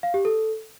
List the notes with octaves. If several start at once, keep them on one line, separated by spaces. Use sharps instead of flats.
F5
G4
A4